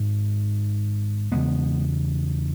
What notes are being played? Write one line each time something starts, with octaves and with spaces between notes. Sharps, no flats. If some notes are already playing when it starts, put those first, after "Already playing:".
Already playing: G#1 G#2
E1 E2 C#3 G#3 B3